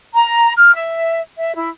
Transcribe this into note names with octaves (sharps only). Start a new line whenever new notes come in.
A#5
F6
E5
E5
E4